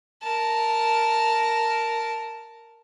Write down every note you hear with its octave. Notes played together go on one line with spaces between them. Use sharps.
A#4 A5